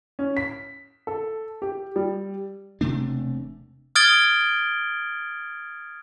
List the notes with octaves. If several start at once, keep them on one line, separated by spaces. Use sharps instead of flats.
C#4
B6
A4
G4
G3
E1 C3 A3 D4
D#6 F6 G#6 A6 D7 G7